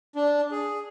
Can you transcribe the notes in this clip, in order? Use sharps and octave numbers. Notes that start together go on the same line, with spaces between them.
D4
G#4